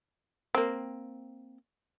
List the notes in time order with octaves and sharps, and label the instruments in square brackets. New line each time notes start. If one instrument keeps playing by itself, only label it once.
[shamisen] A#3 C4